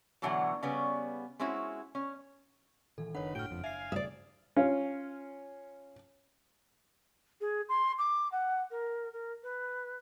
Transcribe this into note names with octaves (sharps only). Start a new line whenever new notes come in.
B2 D3 E3 F#3 A3 F#5
C#3 G3 B3 C#4 B4
G#3 C4 C#4 E4 F#4
C#4
A#2 D#3 E3 A4
F#1 D#3 D4 B4 C#5 F#5
A2 F#4 G5 F6 D7
F2
E5 F5 G#5 C7
D#1 G2 C#3 D5 E5 D#6
C#4 F4
G#4
C6
D6
F#5
A#4
A#4
B4